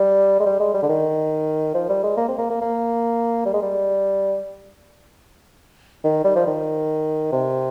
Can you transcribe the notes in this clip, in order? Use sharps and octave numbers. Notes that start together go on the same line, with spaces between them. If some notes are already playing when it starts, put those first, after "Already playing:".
Already playing: G3
G#3
G3
G#3
G3
D3
D#3
F3
G3
G#3
A#3
C4
A#3
A#3
A#3
G3
G#3
G3
D#3
G3
F3
D#3
C3